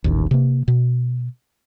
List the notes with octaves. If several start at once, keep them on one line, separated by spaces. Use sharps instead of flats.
D#1 A1 D#2
C3 A#3
B2